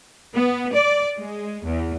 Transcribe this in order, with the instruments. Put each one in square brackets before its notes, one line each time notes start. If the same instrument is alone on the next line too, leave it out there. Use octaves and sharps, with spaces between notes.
[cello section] B3
D5
G#3
E2